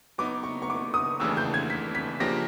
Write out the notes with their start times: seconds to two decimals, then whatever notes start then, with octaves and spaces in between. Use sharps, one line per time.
0.18 F#3 B3 D#4 D6
0.43 C#6
0.62 C#6
0.70 D6
0.94 D#6
1.20 D#2 C#3 E3 A3 D4 E6
1.37 G6
1.54 G#6
1.70 B6
1.95 B6
2.20 C#3 F3 A#3 D4 G4 A#6